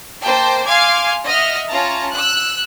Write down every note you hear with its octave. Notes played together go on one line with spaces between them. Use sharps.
A#3 C5 G5 A5
F5 G#5 C6 D6 G#6
D#5 E5 F#5 F6
C#4 F4 A5 A#5
E6 F#6